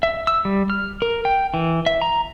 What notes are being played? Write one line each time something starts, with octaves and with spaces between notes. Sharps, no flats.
E5
E6
G3
F6
A#4
G5
E3
E5
A#5